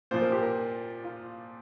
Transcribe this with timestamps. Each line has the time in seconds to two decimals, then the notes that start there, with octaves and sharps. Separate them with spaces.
0.11 A#2 F3 C5
0.22 A#4
0.32 G4
0.43 A#4
1.04 F4